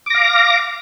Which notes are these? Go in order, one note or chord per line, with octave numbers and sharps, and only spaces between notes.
F5 D6 A#6